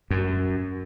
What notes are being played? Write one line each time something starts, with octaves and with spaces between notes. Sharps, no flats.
F#2